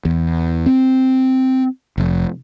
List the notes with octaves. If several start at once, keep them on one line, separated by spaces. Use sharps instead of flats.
E2
C4
F1